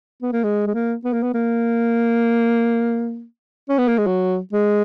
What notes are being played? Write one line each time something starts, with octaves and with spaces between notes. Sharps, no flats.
B3
A#3
G#3
G#3
A#3
B3
A#3
B3
A#3
C#4
B3
A#3
G#3
F#3
G#3